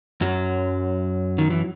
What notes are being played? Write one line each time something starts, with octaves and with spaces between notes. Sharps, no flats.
F#2 F#3
D#3
E3